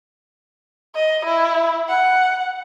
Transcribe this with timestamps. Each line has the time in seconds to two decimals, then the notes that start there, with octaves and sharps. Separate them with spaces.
0.95 D#5
1.25 E4
1.89 F#5